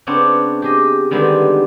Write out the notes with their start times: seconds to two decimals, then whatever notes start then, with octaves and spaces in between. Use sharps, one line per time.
0.07 C#3 B3 C4 D4 C#5
0.62 G4 G#4 D#5
1.11 D3 D#3 G3 G#3 B3 C4